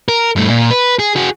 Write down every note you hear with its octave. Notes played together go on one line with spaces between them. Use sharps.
A#4
G2 A3
A#2
B4
G#4
F#4 G#4